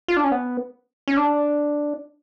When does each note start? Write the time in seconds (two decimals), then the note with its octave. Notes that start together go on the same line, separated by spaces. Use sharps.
0.08 F4
0.17 D4
0.24 C#4
0.32 B3
1.08 C#4
1.17 D4